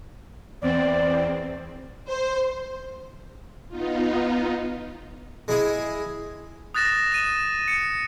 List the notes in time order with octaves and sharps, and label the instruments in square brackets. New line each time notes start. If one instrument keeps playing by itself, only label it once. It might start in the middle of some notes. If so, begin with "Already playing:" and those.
[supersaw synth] E2 C4 [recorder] D5
[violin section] C5
[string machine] B3 D#4 F4
[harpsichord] G#3 E4 G#4
[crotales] D#6 F#6 A6 A#6 E7
D#7 E7
C#7